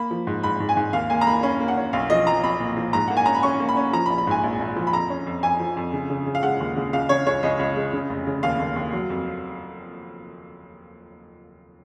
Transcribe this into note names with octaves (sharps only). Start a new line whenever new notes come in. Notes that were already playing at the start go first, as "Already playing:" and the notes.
Already playing: A#3 B5
F3
G#2
G#2 B5
G#2
G#5
G#2
D#2 F5
A#3 G#5
A#5
A#3 B5
C#4 B5
A#3
F#5
C#4
B1 F5
F3 D#5
F3 A#5
B1 B5
A#2
F3
G#2 A#5
A#3 F#5
G#5
C#4 A#5
B5
C#4 C#6
A#3
B5
C#4
F3 A#5
B5
A#1
B5
G#2 G#5
A#1
A#1
F3
B5
F2 A#5
C#4
F2
F2 G#5
F3
F2
C#3
C#3
C#3
F5
G#3 F#5
D#2
C#3
C#2 F5
C#3 C#5
C#2 C#5
C#2 D#5
C#2
G#3
C#3
F1
C#3
D#2 F5
D#2
D#2
F#3
F2